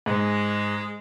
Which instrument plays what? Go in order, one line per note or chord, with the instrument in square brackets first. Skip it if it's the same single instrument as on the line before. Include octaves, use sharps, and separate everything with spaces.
[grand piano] G#2 [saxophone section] G#3